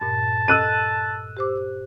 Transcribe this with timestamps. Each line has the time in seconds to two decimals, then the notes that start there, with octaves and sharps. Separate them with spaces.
0.01 G2 A#2 A5
0.48 A4 D#5 E6 F#6 D#7
1.37 G4 C5 D6